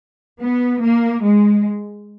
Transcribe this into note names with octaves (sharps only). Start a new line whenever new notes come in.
B3
A#3
G#3